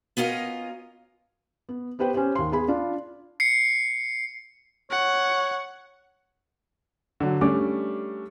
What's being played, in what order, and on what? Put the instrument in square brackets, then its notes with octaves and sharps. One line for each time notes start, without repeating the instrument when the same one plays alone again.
[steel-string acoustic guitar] B3 C#4 F4 A#4 D#5
[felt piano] B3
B3 G4 B4 C5 G5
C#4 G4 C5
D#2 C6
B3 G#4 B5
D4 F4
[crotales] C7 C#7
[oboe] C#5 [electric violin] F#5
[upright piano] D3 F#3
G3 A3 C#4 D4 D6